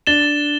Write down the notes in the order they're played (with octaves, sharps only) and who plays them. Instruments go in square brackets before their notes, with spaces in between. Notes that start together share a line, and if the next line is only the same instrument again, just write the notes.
[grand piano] D4 [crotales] A6 E7 G7